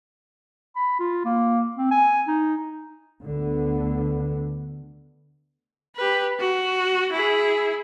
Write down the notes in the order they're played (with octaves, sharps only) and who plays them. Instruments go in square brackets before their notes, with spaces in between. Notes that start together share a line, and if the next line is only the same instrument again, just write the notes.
[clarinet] B5
F4
A#3
C4
G#5
D#4
[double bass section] D2 D3 B3
[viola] G4 B4
F#4
E4 G#4